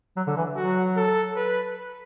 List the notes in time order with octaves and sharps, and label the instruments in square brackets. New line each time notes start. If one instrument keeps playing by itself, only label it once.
[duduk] F#3
D3
E3
[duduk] F#3 [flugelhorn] F#4
[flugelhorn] A4
B4